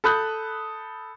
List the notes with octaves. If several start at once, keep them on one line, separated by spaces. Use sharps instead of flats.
A4 B5 D#6 F#6 G6